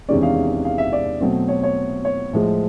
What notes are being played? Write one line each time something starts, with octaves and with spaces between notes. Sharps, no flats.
E2 C3 D#3 G#3 C#4 D5
F5
F5
E5
D5
B2 F#3 A3 C4
C#5
C#5
C#5
A2 F3 G#3